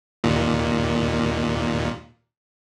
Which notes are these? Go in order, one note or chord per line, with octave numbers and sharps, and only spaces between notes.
D#2 A#2